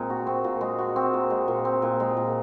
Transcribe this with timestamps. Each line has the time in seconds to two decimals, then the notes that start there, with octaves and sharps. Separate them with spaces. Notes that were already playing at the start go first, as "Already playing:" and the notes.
Already playing: A#2 G#3 C4
0.10 F#4
0.27 C4
0.44 A#2
0.61 G#3
0.79 F#4
0.96 C4
1.14 A#2
1.30 G#3
1.48 A#2
1.65 C4
1.82 A#2
2.00 G#3
2.17 A#2